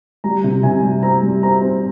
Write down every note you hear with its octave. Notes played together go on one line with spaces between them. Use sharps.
G3 A#5
C3
C3 G#5
G3
C4 A#5
G3
C4 A#5
C4